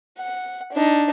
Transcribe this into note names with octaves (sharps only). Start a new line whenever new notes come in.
F#5
D4 D#4